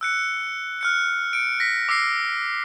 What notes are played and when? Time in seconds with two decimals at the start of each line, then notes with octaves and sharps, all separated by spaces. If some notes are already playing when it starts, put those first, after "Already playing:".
0.01 E6 F#6 C#7
0.81 F6 F#6 C#7
1.33 C#7 D7
1.60 A#6 B6
1.89 D6 E6 A#6 C7